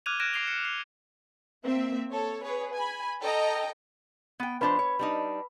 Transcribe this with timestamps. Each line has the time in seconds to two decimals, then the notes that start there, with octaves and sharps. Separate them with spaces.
0.06 D6 F6 F#6 G#6 D#7 F7
0.20 F6 F#6 G#6 A#6 D7 E7
0.33 D6 A#6 C7 D7 F7 G7
0.48 C#7
0.65 C7
1.64 A#3 C4 E5
2.12 A4 C#5
2.44 G#4 B4 C#5
2.74 G#5 B5
3.20 A4 D#5 G5 A#5
4.40 B3 G5
4.61 F3 D4 B4 C5 B5
4.79 C#5
4.99 G3 D4 D#4